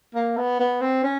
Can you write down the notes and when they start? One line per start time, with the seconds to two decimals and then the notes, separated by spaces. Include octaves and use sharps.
0.15 A#3
0.37 B3
0.60 B3
0.81 C4
1.03 C#4